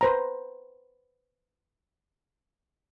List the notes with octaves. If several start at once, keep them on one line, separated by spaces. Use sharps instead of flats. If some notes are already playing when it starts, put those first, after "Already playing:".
B4 C5 A#5